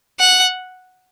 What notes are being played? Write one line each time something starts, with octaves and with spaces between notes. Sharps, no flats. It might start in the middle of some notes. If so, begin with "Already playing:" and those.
F#5